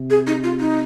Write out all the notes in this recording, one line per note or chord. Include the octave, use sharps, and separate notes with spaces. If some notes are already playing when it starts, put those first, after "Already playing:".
Already playing: C3
G#4
D#4
F4
D#4